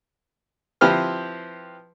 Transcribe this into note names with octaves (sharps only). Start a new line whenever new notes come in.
F3 C4 E4 G4 B4 F6